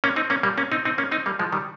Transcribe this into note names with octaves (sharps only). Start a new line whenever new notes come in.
A#3 C#4
C4 D#4
A#3 C#4
G3 A#3
A#3 C#4
C4 D#4
C4 D#4
A#3 C#4
C4 D#4
G3 A#3
F3 G#3
D#3 G3